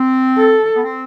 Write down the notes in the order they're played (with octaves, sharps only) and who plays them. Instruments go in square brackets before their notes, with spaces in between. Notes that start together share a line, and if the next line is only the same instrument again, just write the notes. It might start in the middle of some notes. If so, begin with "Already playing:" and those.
Already playing: [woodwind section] C4
[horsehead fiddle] A4
[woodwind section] B3
C4